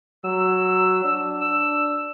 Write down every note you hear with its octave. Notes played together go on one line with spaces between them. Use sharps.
F#3 E6
D4
E6